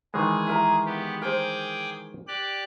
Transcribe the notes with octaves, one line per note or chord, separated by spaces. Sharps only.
D#3 E3 G#3 G#4
E4 A#4 A#5
B3 G4
G#4 A#4 C5 G5 D6
G4 D5 F#6